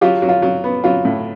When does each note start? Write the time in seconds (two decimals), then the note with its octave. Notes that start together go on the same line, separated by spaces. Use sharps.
0.01 F#3 F4 G4
0.22 F#3
0.29 F4
0.42 F#3
0.64 B3
0.84 F#3 F4
1.05 A2